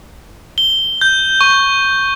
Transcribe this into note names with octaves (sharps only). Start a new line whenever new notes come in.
G7
G6
C#6